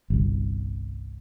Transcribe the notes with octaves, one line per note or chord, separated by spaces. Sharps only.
G1 C2